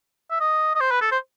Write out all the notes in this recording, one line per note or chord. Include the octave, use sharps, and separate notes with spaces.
E5
D#5
D#5
C5
B4
A4
C5